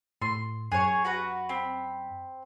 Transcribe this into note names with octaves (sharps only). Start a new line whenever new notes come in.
A2 C6
F#2 G#4 C#5
F#4 B4 A#5
C4 B5